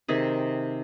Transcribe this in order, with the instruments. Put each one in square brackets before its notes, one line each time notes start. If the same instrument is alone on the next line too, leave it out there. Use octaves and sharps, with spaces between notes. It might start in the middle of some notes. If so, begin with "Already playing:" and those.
[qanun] C3 D#3 G#4